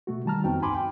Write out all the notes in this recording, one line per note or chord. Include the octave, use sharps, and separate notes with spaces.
B2 A3 F#4
D#3 G3 A5 A#5 F6
F2 B3 C4 D#4 F#4 G5
D2 G2 G#5 B5 C6 D6
G5